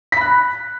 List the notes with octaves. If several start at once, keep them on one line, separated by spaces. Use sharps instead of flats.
B5 F#6 B6